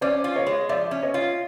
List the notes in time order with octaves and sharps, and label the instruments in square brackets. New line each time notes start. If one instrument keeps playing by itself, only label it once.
[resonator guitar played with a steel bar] C#4 [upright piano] C5 D5
[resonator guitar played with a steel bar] F4
[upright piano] C#5 D#5
[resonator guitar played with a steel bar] G#3
[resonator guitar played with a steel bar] F3 [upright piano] D5 E5
[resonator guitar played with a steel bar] C#4
[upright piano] C#5 D#5
[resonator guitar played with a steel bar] F4